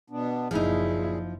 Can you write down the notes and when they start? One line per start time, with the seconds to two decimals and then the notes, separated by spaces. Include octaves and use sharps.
0.10 B2 B3 D4
0.51 F#1 A#2 F3 D#4 E4 G#4